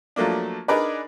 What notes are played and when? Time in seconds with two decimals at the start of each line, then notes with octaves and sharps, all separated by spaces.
0.16 F3 F#3 A3 A#3 D4
0.68 D4 D#4 G#4 A#4 B4 D5